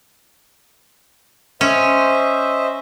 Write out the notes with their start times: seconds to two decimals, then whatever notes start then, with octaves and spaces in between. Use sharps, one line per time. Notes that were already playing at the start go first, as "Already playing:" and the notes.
1.61 C#4 C5 D#5 E5